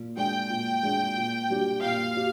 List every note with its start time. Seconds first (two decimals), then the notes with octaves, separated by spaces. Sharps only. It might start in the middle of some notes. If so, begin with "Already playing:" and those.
Already playing: A#2
0.17 G#3 D4 G#4 G5
0.50 A#2
0.83 G#3 D4 G#4
1.17 A#2
1.50 G3 D4 G4
1.83 A#2 F5
2.17 G4